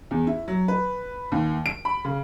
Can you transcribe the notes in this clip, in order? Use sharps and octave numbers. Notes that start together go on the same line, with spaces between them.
E2
E4
F#3
B4
D#2
D7
B5
C#3